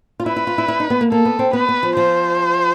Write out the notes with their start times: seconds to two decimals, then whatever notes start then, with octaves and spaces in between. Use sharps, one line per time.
0.20 F4
0.26 E4 B4
0.36 E4
0.47 F4
0.58 E4
0.68 E4
0.80 D#4
0.90 B3
1.01 A#3
1.11 A#3 A4
1.25 B3
1.39 C4
1.53 B3 B4
1.69 B3
1.83 F3
1.96 F3 C5